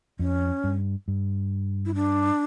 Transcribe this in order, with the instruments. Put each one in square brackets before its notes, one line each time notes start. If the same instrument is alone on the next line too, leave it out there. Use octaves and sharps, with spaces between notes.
[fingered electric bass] F2 [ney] C#4
[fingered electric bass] G2
G2
[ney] E4
D4